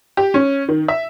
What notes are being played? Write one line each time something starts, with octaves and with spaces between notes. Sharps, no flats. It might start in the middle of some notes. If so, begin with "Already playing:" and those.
G4
C#4
D#3
E5